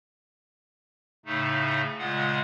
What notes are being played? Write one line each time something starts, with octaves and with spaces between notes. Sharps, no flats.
A2 C#3 A3 D#4
A#2 C#3 G#3 F4 F#5